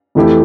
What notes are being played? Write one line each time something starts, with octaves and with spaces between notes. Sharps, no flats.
F2 E3 A3 E4 G4